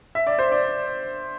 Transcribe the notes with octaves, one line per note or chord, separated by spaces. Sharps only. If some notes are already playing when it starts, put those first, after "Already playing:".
E5
D5
C5
D5